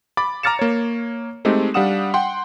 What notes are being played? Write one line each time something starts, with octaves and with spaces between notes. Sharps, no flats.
B5 D6 A6
A#5 D6 F6 A6 C#7 E7
A#3 C#5
G#3 A3 C4 D#4 G4
G3 D4 F5 F#5 D#6 E7
F#5 G5 C6